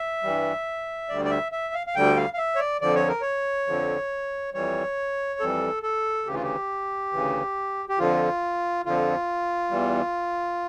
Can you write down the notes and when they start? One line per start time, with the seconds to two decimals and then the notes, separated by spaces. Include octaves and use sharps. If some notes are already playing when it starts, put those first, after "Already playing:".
Already playing: E5
0.23 G2 E3 G3
1.08 D2 D3 G3 D5
1.25 D5
1.30 E5
1.52 E5
1.74 F5
1.87 F5
1.95 D2 D3 G3 G5
2.17 F5
2.33 F5
2.38 E5
2.55 C#5
2.59 D5
2.81 F2 D3 F3 D5
2.95 C#5
3.08 A#4
3.21 C#5
3.67 F2 D3 F3
4.54 F2 E3 G3 C#5
5.40 F2 E3 G3 A4
5.83 A4
6.26 D2 C#3 E3 G4
6.34 F4
6.42 G4
7.12 D2 C#3 E3
7.89 G4
7.98 F2 D3 F3 F4
8.86 F2 D3 F3 F4
9.71 E2 E3 G3